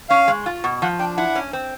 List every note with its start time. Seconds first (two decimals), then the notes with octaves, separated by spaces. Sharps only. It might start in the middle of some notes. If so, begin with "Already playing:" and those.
0.09 C#4 F5
0.28 G#3
0.46 F4
0.64 B2
0.82 F3 F#5
0.99 D4 G5
1.17 E4 F#5
1.35 C#4
1.53 C4